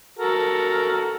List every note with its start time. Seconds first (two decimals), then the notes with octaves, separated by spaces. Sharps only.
0.19 F#4 A4 A#4